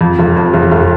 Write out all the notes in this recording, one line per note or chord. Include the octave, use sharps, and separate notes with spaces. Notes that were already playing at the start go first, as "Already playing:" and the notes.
F2
F1
F2
F1
F1